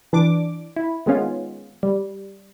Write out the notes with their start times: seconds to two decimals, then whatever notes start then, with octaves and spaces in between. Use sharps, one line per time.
0.13 E3 D4 D6
0.76 E4
1.06 D#3 G#3 B3 C#4 F4
1.83 G3